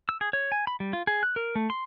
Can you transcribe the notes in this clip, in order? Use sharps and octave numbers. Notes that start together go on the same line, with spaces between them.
E6
G#4
C#5
G#5
B5
G3
F4
G#4
F#6
A#4
A3
C6